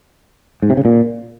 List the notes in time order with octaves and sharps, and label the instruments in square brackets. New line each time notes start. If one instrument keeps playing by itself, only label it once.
[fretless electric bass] G#2
C3
C#3
A#2